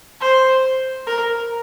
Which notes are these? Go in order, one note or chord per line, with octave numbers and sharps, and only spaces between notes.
C5
A#4